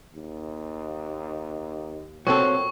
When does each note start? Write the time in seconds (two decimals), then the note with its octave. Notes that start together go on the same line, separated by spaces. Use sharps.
0.14 D#2
2.27 A#2 F#3 C4 A4 C#6